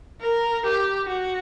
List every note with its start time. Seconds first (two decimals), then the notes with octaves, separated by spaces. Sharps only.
0.21 A#4
0.65 G4
1.08 F#4